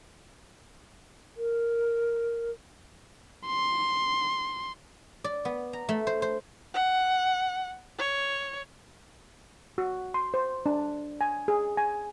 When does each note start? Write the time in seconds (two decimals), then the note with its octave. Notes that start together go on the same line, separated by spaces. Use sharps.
1.37 A#4
3.47 C6
5.24 D5
5.45 B3
5.73 A#5
5.89 A3
6.07 C5
6.22 C5
6.74 F#5
7.98 C#5
9.78 F#4
10.14 C6
10.34 C5
10.66 D4
11.21 G#5
11.48 G#4
11.77 G#5